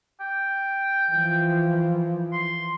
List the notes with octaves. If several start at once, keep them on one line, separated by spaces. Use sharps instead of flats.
G5
E3 F3
C6